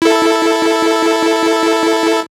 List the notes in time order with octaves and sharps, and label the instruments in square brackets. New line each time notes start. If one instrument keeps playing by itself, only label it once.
[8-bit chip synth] E4 A4